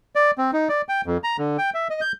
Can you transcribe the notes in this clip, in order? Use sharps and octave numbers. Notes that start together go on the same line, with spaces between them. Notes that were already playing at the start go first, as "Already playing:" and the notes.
D5
C4
D#4
D5
G5
F2
A#5
D3
G5
E5
D#5
G6